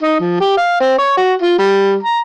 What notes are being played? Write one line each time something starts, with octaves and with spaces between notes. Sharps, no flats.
D#4
F3
G4
F5
C4
C#5
F#4
F4
G3
A#5